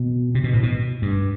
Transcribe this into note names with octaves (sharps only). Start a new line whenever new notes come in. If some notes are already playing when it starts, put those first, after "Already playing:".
Already playing: B2
C3
B2
A2
B2
G2